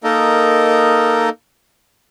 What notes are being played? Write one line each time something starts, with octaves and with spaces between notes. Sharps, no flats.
A#3 D#4 A4 A#4 D#5